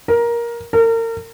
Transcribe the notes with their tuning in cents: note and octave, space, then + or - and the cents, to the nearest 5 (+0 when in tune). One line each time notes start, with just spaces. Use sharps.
A#4 +15
A#4 -35